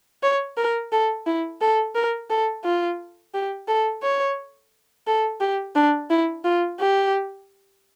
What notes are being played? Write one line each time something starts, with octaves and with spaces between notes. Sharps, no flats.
C#5
A#4
A4
E4
A4
A#4
A4
F4
G4
A4
C#5
A4
G4
D4
E4
F4
G4